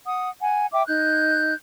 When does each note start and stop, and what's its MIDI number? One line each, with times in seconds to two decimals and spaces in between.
0.06 0.30 78
0.06 0.30 87
0.40 0.67 78
0.40 0.67 80
0.73 0.84 76
0.73 0.84 79
0.73 0.84 86
0.87 1.53 63
0.87 1.53 90
0.87 1.53 91